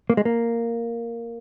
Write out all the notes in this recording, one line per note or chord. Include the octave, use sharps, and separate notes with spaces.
A#3
G#3
A#3